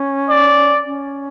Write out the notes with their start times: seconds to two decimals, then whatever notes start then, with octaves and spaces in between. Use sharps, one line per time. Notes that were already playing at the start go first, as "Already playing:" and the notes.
Already playing: C#4
0.30 D5
0.85 C#4